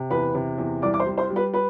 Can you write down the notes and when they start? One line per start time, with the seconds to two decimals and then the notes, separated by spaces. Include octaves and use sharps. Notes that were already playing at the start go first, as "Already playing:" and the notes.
Already playing: C3
0.10 E2 B4 B5
0.35 C3
0.58 E2
0.82 C2 D5 D6
0.94 D6
1.00 C5 C6
1.06 G3
1.18 C5 C6
1.30 G3
1.36 B4 B5
1.54 B4 B5